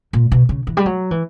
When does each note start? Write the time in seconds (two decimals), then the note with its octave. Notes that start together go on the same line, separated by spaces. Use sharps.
0.13 A#2
0.32 B2
0.49 C#3
0.67 E3
0.77 G3
0.86 F#3
1.11 E3